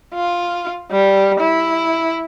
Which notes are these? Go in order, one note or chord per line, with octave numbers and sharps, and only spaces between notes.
F4
G3
E4